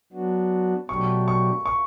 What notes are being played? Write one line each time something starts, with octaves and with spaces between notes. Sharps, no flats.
F#3 B3 D4 F#4
B2 F#3 A3 D4 G4 C#6
C#6
C#6